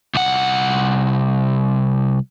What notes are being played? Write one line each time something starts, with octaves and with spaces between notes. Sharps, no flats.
C2 F#5